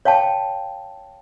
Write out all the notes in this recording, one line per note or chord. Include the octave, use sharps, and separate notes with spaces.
C#5 F5 G5 A5